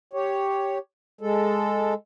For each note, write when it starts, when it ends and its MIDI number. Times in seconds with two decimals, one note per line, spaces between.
0.13 0.78 67
0.13 0.78 73
1.21 1.94 56
1.21 1.94 69